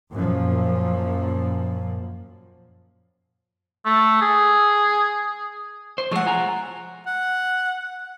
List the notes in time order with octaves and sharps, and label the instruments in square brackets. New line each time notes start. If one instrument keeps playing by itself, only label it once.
[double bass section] F#2 A#2 F3
[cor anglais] A3
G#4
[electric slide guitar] C5
[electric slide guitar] F3 G#3 A3 [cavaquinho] C#5 F#5
[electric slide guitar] F4 G#5 A#5
[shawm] F#5